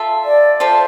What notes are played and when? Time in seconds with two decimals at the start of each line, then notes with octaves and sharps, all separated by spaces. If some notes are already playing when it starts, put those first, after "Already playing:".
Already playing: F4 A4 E5
0.25 D5
0.60 F4 A4 C5 E5